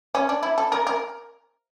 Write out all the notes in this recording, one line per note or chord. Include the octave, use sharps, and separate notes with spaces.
C#4
D4
E4
A4
A#4
A#4